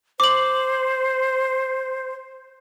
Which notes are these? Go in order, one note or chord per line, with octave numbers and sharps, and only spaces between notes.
C5 D6 F#7